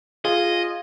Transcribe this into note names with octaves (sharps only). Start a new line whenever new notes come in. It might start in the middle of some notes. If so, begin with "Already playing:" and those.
F4 G#4 D#5